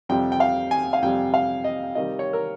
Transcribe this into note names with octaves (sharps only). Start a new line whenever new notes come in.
F2 C3 G3 G5
G5
F5
G#5
F5
F2 C3 G3 G5
F5
D#5
C3 D#3 G3 D#5
C#5
A#4